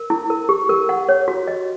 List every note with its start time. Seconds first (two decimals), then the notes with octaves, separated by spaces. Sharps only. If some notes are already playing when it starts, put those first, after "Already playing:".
Already playing: A#4
0.10 E4
0.30 A#4
0.49 G4
0.69 A#4
0.89 F#5
1.09 C#5
1.28 F#4
1.48 D#5